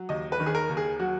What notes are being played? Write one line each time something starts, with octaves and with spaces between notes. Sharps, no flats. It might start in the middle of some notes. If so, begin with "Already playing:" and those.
Already playing: F#3
D#2 D#5
B4
D#3
G#4
A#4
D#2
G#4
F#3 F#4